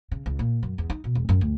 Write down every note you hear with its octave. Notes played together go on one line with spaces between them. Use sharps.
C#3
C#2
A#2
F#2
E2
D#4
B2
E1
F#2
D2